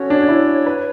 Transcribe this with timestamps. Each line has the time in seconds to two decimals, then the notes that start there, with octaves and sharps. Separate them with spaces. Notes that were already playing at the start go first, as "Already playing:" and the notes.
Already playing: C#4 F#4 A4 C#5
0.10 D4
0.29 E4
0.66 B4